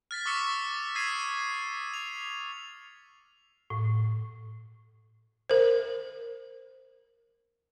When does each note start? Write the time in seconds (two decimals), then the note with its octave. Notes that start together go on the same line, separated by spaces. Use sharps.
0.11 F6 A6 B6
0.26 C#6 D6 E6 B6 C#7 E7
0.95 D#6 G#6 B6 C7 D#7
1.94 F7
3.70 A2
5.50 A#4 C5